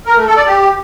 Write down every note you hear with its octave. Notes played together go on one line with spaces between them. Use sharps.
A#4
A3
A4
D5
G4